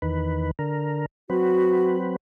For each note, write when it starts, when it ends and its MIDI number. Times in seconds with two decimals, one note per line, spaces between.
0.02 0.51 40
0.02 0.51 51
0.02 0.51 71
0.59 1.06 50
0.59 1.06 70
1.30 2.16 54
1.30 2.16 60
1.30 1.97 66
1.30 2.16 71